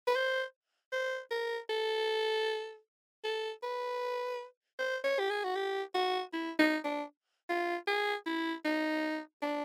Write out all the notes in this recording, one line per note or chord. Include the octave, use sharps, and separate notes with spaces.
B4
C5
C5
A#4
A4
A4
B4
C5
C#5
G4
G#4
F#4
G4
F#4
E4
D#4
D4
F4
G#4
E4
D#4
D4